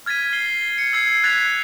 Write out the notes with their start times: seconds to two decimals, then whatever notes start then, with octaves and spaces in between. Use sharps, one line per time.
0.06 F6 G#6 A6 B6 D#7
0.33 C7 G7
0.78 C#7
0.93 E6 G#6 C7
1.24 F#6 G#6 A6 B6 C7 F7